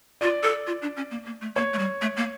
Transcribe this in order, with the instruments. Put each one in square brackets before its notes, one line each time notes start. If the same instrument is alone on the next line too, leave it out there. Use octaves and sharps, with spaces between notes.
[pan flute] F4 [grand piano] D5
[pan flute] A4
F4
D4
C#4
A#3
A#3
A3
[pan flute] A#3 [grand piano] C#5
[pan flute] A3
G3
A3
A#3